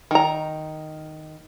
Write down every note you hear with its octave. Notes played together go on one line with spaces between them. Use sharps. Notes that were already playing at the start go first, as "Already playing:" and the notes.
D#3 A#5